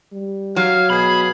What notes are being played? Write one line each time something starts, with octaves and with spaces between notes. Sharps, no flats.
G3
F#3 F5
B2 G#4 B5